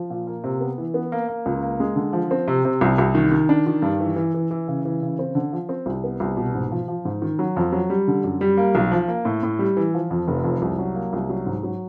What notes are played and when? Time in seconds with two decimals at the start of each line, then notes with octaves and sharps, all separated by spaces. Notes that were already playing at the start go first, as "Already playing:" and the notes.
Already playing: F3
0.10 A#2
0.27 A#3
0.44 C3
0.61 B3
0.78 E3
0.94 B3
1.12 A#3
1.28 A#3
1.46 C#2
1.63 A#3
1.80 G#3
1.96 D3
2.13 F3
2.31 C4
2.48 C3
2.65 C3
2.81 C2
2.98 C2
3.15 D#3
3.31 D#3
3.49 D4
3.67 D#3
3.82 G2
4.01 E3
4.16 E3
4.34 E3
4.51 E3
4.68 C#3
4.85 E3
5.02 C#3
5.19 C4
5.35 D3
5.52 F3
5.69 C4
5.86 C2
6.04 B3
6.20 C2
6.37 B2
6.54 G#2
6.71 F3
6.88 F3
7.05 G#2
7.22 D#3
7.39 F#3
7.57 F2
7.72 F#3
7.90 G3
8.08 D3
8.24 F#2
8.41 G3
8.57 A#3
8.75 B1
8.91 F3
9.08 A#3
9.25 A2
9.43 A2
9.59 G3
9.77 E3
9.94 F3
10.11 F2
10.28 F1
10.44 F2
10.62 C2
10.78 F#3
10.95 A#3
11.13 C2
11.29 F#3
11.46 G#2
11.63 F#3